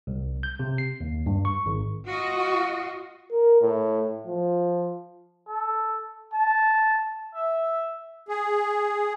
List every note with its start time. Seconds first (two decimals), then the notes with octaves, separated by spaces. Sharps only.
0.07 C2
0.43 G6
0.59 C3
0.78 C7
1.00 D#2
1.26 G2
1.45 C#6
1.66 G#1
2.07 F4 F#4 D#5
3.32 A#4
3.62 A2
4.27 F3
5.48 A4
6.33 A5
7.35 E5
8.28 G#4